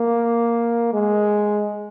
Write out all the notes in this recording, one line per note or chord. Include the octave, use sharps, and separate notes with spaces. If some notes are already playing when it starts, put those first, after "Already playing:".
Already playing: A#3
G#3